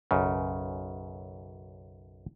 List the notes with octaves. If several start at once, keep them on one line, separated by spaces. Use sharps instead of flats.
B1 F#2 C#3